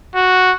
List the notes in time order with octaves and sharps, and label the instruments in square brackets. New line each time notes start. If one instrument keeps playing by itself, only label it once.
[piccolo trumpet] F#4